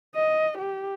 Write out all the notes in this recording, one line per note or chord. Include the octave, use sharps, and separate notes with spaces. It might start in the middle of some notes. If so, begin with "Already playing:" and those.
D#5
G4